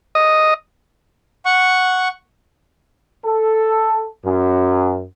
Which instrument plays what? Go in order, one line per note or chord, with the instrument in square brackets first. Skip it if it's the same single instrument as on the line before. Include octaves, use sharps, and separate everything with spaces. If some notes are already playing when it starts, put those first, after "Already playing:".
[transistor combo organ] D#5
[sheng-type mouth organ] F#5 C#6
[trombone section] A4
F#2